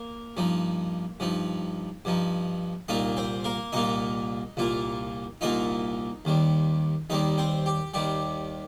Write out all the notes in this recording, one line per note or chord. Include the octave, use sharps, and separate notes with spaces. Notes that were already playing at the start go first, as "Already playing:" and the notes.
Already playing: A#3 A#4
G2 F3 D#4
G2 F3 D#4
G2 F3 D#4
C2 A#2 A#3 D#4 F4 D#5
C4 C5
A#3 A#4
C2 A#2 A#3 D#4 F4 D#5
C2 A#2 A#3 F4
C2 A#2 A#3 D#4 F4 D#5
D#2 D#3 G3
D#2 D#3 G3 D#4 D#5
C4 C5
G4
D#2 D#3 G3 G4